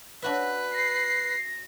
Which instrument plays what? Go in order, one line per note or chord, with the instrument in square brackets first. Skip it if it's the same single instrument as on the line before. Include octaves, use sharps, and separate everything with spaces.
[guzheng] D4 F#4 E5 [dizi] B4
[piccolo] A#6 [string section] C7